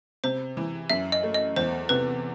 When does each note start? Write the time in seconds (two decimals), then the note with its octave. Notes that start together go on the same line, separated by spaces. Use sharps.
0.24 C3 C5
0.57 E3
0.90 F#2 E5
1.12 D#5
1.23 A3
1.34 D#5
1.56 E2 C5
1.89 C3 B4